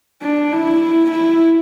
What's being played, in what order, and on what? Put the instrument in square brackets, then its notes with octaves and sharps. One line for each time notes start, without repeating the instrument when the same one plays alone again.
[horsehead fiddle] D4
E4
E4